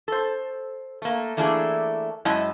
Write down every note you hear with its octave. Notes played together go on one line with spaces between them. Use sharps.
A4 C5
A3 A#3
E3 A3 A#3 D4 E4 G#4
F#2 G#3 E4 D#5 E5 A5